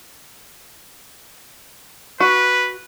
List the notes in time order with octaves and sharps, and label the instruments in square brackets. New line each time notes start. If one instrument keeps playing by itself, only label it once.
[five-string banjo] F#4 [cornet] B4